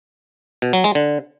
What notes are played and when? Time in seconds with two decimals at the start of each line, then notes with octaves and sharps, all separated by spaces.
0.62 B2
0.73 F#3
0.84 G#3
0.95 D3